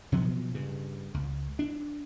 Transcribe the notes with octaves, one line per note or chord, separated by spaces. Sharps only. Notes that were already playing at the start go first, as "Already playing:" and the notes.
B2 F3 F#3 B3
G2 C#3
C#2
D4